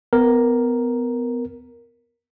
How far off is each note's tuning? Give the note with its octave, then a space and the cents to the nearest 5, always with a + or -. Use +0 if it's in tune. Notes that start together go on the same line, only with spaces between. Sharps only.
B3 +25 A#4 +0